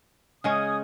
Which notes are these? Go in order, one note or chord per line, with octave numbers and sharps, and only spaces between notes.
C#3 G#3 C#4 G#5 D#6